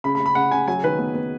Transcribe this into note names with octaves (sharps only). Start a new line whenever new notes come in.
C#3 B5
B5
C#3
B5
C#3 F#5
C#3 G#5
F#3 G#5
D#3 B4
B3
B3